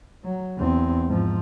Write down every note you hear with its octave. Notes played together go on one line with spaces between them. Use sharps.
F#3
E2 C4
G#2 F3